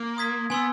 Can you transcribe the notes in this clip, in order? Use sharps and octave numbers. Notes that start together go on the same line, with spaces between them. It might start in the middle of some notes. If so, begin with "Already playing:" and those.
Already playing: A#3
C6 D#6 G#6 B6
B3 G#5 C6 E6